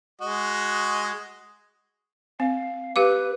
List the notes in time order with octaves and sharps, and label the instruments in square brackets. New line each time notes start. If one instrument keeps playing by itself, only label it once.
[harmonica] G#3 F#4 D#5
[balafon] C4 [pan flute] F5
[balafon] G4 F5 D6 [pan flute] B4